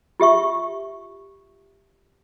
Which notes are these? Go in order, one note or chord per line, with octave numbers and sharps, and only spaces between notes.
F4 G4 E5 C#6